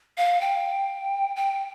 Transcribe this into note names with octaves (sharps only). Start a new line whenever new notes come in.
F5
G5
G5